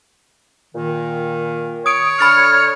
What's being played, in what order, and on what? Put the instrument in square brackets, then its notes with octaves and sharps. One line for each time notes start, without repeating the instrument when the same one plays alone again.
[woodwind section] A#2 D#3
[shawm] C#5 [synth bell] D#6 D7
[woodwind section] D3 F6 [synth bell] B5 A6 C#7